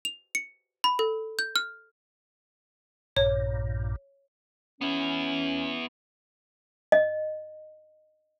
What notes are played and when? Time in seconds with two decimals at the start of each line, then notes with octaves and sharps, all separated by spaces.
0.05 F7
0.35 C#7
0.84 B5
0.99 A4
1.39 G6
1.56 F6
3.17 A#1 G2 A#2 C#5
4.81 B3 C#4 E4
6.92 D#5